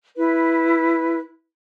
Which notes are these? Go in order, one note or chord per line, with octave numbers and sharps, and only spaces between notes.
E4 B4